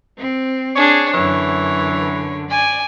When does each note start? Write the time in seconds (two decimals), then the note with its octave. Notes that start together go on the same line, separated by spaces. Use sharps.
0.18 C4
0.76 D4 G#4 C#5
1.13 F#2 D3 E3 C#5
2.50 D5 G#5